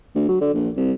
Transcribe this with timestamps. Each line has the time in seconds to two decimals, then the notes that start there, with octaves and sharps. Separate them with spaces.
0.15 D2
0.29 F#3
0.41 D3
0.54 A#1
0.77 C2